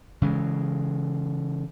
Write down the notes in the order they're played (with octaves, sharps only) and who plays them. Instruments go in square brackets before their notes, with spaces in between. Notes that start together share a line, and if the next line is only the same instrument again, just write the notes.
[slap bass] C#3 E3 G#3